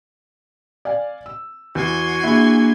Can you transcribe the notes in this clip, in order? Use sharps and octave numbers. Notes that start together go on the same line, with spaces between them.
D5 F5 G#5
E6
E2 F#4 G#5 C6
A#3 D4 E4 G#4